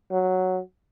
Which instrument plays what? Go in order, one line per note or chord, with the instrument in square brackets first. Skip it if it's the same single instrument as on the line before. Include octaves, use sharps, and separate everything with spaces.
[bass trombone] F#3